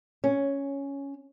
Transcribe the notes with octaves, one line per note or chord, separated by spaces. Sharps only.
C#4